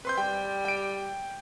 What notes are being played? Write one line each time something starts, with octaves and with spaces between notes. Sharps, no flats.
C4 B4 C6 G6
G3 G5
G5 D7